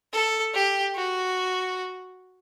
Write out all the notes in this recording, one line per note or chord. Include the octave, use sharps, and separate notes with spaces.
A4
G4
F#4